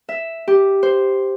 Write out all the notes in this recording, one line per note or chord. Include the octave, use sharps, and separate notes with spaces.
E5
G4
C5